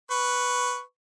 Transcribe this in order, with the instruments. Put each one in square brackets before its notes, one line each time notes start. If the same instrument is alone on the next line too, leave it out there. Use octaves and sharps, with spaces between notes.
[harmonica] B4 C#6